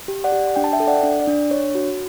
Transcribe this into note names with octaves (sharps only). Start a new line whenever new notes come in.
G4
D5 F#5
G4
D4 G5
A5
E5 G5
A4
D5 F#5
D4
D5
D4
D4 C#5
F#4